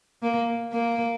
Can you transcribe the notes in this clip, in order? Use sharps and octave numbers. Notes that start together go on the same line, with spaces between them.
A#3
A#3